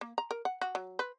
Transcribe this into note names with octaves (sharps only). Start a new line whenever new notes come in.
A#3
A#5
A#4
F#5
F#4
F#3
B4